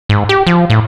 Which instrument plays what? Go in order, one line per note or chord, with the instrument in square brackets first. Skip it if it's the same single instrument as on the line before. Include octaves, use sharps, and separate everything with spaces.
[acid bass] G#2
G4
F3
A2